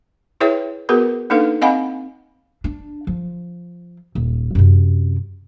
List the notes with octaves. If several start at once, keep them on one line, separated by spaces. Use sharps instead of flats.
E4 G#4 B4 C#5 E5 G5
B3 F#4 G#4 A#4 B4
A#3 D4 D#4 A4 B4 F5
C4 D#5 F5 F#5 G#5 B5
D4
F3
D#1
F#2 C3